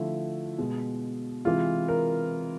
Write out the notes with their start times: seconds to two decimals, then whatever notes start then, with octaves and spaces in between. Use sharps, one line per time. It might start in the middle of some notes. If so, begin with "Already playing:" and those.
Already playing: D3 F3 A3 E4
0.58 B2 G#3
1.45 C3 E3 G#3 F4
1.88 A#4